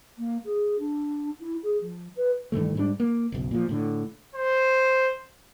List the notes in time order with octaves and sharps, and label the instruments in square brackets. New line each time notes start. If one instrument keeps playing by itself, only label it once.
[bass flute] A#3
G#4
D4
E4
G#4
F3
B4
[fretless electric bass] G2 D#3 E3 A3
G#2 G3 D4
A#3
F#1 B1
A#2 F3
A2 D3
[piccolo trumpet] C5